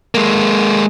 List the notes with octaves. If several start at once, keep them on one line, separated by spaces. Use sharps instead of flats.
G#3 A#3